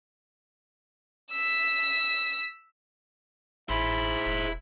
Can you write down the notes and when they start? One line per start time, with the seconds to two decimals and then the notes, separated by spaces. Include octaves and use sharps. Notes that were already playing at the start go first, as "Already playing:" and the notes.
1.32 E6 B6
3.69 G#1 E4 G#4 C5 B5
4.26 E1